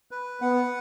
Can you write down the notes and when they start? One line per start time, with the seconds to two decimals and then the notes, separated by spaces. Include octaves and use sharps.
0.11 B4
0.41 B3 F#5